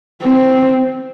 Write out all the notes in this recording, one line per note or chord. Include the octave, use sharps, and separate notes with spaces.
C4